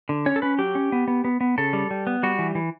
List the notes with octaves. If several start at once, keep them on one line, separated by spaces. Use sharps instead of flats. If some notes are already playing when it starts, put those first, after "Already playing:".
D3
C#4 C#5
A4
C#4 B4
F#3 G4
C#4
B3
B3
B3
B3
C#3 A4
G3
G3
B3
G3 F#4
E3
E3